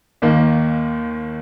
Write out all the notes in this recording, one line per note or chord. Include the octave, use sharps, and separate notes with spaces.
D#2 D#3 A#3